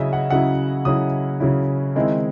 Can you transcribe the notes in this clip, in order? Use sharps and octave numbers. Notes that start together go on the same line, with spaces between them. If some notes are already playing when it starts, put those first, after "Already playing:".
Already playing: C#3 F#3 C#4 E4 D#5 E5
F#5
C#3 F#3 C#4 E4 F#5
C#3 F#3 C#4 E4 D#6
C#3 F#3 C#4 E4
D#3 G#3 C4 E4